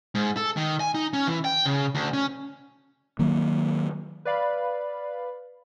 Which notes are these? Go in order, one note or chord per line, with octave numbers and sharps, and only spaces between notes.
G#2
A4
D#3
G#5
D#4
C#4
E3
G5
C#3
D2
C#4
D#3 F#3 A#3
B4 D5 F5 B5